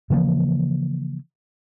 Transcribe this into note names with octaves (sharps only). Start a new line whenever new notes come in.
C#3 E3 F3 A#3